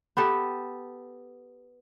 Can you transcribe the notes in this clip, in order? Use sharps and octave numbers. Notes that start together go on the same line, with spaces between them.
B3 G4 A4